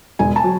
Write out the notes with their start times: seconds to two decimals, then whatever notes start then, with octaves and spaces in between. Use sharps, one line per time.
0.19 E1 G#5
0.36 A5
0.44 F#3